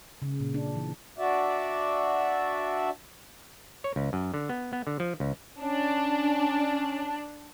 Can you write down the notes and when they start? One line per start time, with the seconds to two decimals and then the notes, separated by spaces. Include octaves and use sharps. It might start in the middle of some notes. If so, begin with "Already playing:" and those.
0.22 C#3
0.40 A#2
0.54 D4
0.76 E3
1.18 D4 F#4 D5 E5
3.84 C#5
3.96 C#2
4.13 F#2
4.34 D3
4.49 B3
4.73 B3
4.87 D3
5.00 F3
5.20 C#2
5.62 C#4 D4